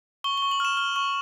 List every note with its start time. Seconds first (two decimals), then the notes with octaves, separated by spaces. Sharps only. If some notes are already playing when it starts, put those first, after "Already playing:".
0.24 C#6 G7
0.38 G7
0.42 C#6
0.51 F#7
0.60 F6 E7
0.77 F6
0.96 C#6